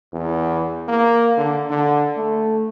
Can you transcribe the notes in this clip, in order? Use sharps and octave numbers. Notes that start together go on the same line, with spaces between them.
E2
A#3
D3
D3
A3